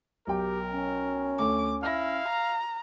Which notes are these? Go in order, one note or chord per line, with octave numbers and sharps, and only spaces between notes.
B1 G4 A#4 G5
C#4
D2 A4 D6
E4 F5 F6 A#6
A#5